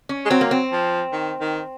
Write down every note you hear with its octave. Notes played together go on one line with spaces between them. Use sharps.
C#4
G#3
F#3 C4
A#3
C4
F3
D#3
D#3